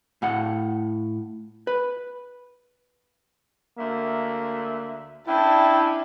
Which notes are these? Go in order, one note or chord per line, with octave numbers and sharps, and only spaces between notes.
A2 F5 F#5
B4
D2 A#3 E5
C#4 D4 E4 G5 A5